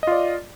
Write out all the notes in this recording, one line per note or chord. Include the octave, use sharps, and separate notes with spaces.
F4 D5 D#5